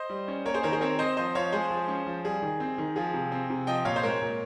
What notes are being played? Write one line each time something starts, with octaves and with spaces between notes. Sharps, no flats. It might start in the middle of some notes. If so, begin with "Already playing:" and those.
Already playing: C5 D#5
G3
C#4
A#3 A#4 C#5
G#4 C5
D#3 A#4 C#5
G#4 C5
C4 A#4 C#5
C4 C5 D#5
F3 C5 D#5
F3 C#5 F5
G#3 G#4 C5
F3
C#4
F3
G3 G#4
D#3
C4
D#3
F3 G#4
C3
C4
C3
F3 D#5 G5
A#2 C#5 F5
C5
G#3 A#4 C#5
A#2